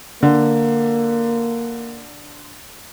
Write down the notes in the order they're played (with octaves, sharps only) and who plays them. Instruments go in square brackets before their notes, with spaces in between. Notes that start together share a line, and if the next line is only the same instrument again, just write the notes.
[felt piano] D3 [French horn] A#3